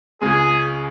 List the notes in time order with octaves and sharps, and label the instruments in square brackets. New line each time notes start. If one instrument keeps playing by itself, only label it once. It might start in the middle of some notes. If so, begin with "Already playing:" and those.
[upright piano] C#2 C#3 G#3 [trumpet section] G#4